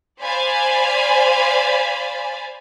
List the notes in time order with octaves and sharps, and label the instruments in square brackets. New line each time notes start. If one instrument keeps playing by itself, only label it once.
[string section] C5 D5 F5 G#5 B5